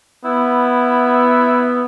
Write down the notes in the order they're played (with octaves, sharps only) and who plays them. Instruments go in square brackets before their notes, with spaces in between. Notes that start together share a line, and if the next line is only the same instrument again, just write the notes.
[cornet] B3 [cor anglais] E4